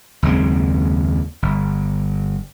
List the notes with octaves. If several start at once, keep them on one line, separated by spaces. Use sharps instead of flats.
F#1 D#2 G#3 C4
G1